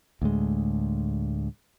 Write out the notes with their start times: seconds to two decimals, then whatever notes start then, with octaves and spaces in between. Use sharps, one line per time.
0.22 D2 A2 G#3